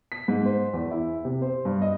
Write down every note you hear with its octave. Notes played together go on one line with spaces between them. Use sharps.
B6
G#2
C5
E2
E4
C3
C5
G2
D#5